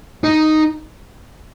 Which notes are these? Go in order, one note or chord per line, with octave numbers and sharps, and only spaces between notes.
D#4